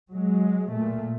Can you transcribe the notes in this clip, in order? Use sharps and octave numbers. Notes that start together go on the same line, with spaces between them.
F#3 G#3
A#2 A3